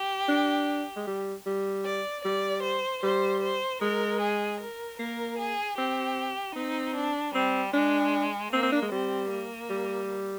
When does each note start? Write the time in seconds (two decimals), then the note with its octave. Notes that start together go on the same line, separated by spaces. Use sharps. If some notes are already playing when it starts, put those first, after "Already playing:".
Already playing: G4
0.29 D4
0.96 G#3
1.07 G3
1.46 G3
1.86 D5
2.25 G3 D5
2.64 C5
3.03 G3 C5
3.43 C5
3.81 G#3 A#4
4.21 G#4
4.61 A#4
4.99 A#3 A#4
5.39 G#4
5.78 C4 G4
6.56 C4 D#4
6.95 D4
7.35 G3 C4
7.74 G#3 D4
8.52 A#3 C4
8.63 C4
8.72 D4
8.82 G#3
8.92 G3 C4
9.31 A#3
9.70 G3